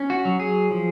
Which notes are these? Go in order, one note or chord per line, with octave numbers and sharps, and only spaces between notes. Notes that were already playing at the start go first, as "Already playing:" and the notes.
Already playing: C#4
F#4
F#3
G#4
F3